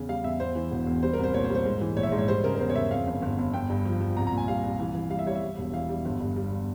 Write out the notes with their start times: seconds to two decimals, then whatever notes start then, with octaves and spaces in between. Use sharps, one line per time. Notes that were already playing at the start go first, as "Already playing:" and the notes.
Already playing: E2 C#3
0.09 G3 F5
0.24 E2 E5
0.40 E2 C5
0.55 E3
0.72 E1
0.87 E2
1.03 G3 C5
1.13 A#4
1.19 C2 C5
1.34 A#2 C#5
1.44 C5
1.49 G3
1.55 C5
1.65 G#2
1.81 E3
1.96 A#1 C#5
2.03 E5
2.07 C#5
2.12 G#2
2.18 C#5
2.28 G3 C5
2.44 C#3 A#4
2.55 A#4
2.59 E2 C5
2.70 C#5
2.75 C#3 E5
2.91 F2 F5
3.07 G1
3.22 G1
3.38 G1
3.54 G1 G5
3.70 G2
3.85 F3
4.01 F3
4.17 C2 A#5
4.27 A#5
4.32 A#2
4.37 G#5
4.48 G3 F5
4.64 C2
4.80 E3
4.95 E3
5.10 G3 F5
5.19 E5
5.26 G3 C#5
5.35 E5
5.42 G3
5.58 E1
5.74 E3 F5
5.89 G3
6.05 G1
6.20 G2
6.36 G3